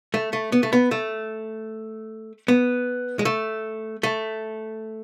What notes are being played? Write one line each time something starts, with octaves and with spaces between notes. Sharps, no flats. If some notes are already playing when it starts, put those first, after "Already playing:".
A3
A3
B3
A3
B3
A3
B3
G#3
A3
A3